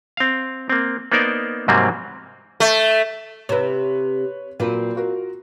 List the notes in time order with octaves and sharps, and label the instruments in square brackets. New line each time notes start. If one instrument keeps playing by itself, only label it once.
[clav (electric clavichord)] C4 F5
A#3 C4
A#3 B3 D#4 A#4 C5 D5
G#2 C3 F#3 G3 A#3 C4
[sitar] A3
[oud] C3 E4 [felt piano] B4 C#5
[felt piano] A#2 F#3 A#3 [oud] C4 B4
[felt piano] F4 F#4 A#4